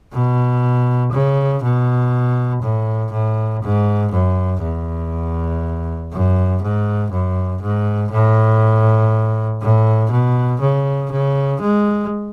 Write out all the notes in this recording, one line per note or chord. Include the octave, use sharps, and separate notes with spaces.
B2
C#3
B2
A2
A2
G#2
F#2
E2
F#2
G#2
F#2
G#2
A2
A2
B2
C#3
C#3
G#3